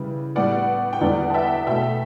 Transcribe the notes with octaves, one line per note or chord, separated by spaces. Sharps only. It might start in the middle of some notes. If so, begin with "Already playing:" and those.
Already playing: C#3 E3 G3 B4
A2 G3 B3 D5 F#5
G5
E2 D3 G3 B3 D5 F#5
A5
E5 G5
B2 A3 E5 G5